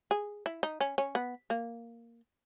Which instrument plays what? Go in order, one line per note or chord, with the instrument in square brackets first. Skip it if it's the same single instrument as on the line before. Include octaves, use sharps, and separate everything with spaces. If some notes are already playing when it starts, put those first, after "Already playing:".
[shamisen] G#4
E4
D#4
C#4
C#4
B3
A#3